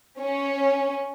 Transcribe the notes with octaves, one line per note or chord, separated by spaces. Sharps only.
C#4